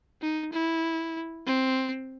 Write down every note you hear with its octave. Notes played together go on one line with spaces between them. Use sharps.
D#4
E4
C4